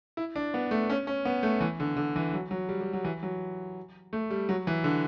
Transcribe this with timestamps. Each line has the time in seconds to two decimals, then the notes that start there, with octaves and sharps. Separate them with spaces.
0.17 E4
0.36 D4
0.54 B3
0.71 A3
0.90 C#4
1.07 C#4
1.25 B3
1.43 A3
1.61 E3
1.80 D3
1.96 D3
2.16 E3
2.33 F#3
2.51 F#3
2.69 G3
2.81 G3
2.93 F#3
3.04 E3
3.23 F#3
4.13 A3
4.30 G3
4.49 F#3
4.67 E3
4.84 D3